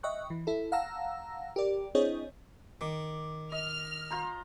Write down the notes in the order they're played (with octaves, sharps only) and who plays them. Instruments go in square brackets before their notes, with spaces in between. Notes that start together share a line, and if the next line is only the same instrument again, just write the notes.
[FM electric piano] D#5 E5 G5 C#6 F#6
E3
E4 A4
F5 F#5 A5 A#5 E6 A#6
G4 A#4 D5
C4 D4 E4 G#4 C#5 D#5
[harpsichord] D#3 [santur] D6
[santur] D#5 [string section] F6
[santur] F4 C5 A#5